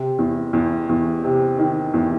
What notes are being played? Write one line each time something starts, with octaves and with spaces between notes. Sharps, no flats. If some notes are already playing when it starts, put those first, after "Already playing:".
Already playing: C3
E2
E2
E2
C3
D#3
E2